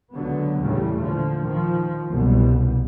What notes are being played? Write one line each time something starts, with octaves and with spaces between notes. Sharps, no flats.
C#2 D3 F#3 B3
E2 A2 C#3 G3 A3
A#2 D3 F3
D#3 F3
F#1 C2 B2 G3